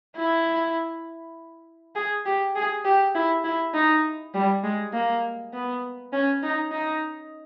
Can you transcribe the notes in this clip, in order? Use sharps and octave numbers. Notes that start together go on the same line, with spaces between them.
E4
G#4
G4
G#4
G4
E4
E4
D#4
G3
G#3
A#3
B3
C#4
D#4
D#4